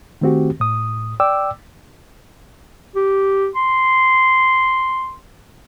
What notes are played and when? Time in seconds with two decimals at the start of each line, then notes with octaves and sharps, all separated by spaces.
0.21 D#3 A3 C4 F#4 G4
0.60 A2 D#6
1.20 D5 G5 D6 E6
2.95 G4
3.55 C6